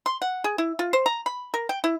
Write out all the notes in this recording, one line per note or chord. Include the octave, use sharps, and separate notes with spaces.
C6
F#5
G#4
E4
F4
C5
A#5
B5
A#4
G5
E4